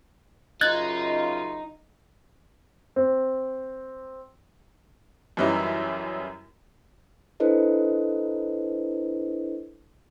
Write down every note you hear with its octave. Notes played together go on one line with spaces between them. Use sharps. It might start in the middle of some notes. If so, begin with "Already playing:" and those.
F#2 C#3 D#4 F4 F#6 G#6 A6
C4
F#2 E3 G3 C#4 D#4 E4
D4 E4 A4 B4 C5 D#5